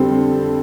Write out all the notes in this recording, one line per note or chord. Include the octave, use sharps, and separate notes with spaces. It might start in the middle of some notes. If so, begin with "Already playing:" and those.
Already playing: F2 D3 G3 C4 A4